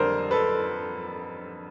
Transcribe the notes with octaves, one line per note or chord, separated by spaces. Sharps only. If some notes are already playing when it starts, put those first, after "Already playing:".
Already playing: F2 D3 G3 A#3 A#4 C5
A4 B4